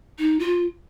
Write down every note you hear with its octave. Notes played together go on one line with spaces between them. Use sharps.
D#4
F4